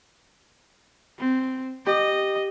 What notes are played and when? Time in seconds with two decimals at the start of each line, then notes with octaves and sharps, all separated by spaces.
1.19 C4
1.86 G4 D#5